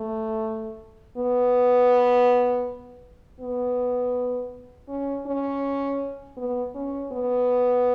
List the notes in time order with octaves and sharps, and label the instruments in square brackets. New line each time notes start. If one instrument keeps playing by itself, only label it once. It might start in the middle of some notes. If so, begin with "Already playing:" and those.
Already playing: [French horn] A3
B3
B3
C#4
C#4
B3
C#4
B3